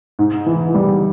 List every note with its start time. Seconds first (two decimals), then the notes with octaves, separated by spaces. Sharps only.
0.19 G#2
0.46 E3
0.74 G3